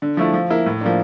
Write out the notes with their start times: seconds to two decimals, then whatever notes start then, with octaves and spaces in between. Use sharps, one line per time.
0.02 D3
0.17 F3 A3 E4
0.34 F3
0.50 A#3 E4
0.66 A2
0.81 F3 A#3 D4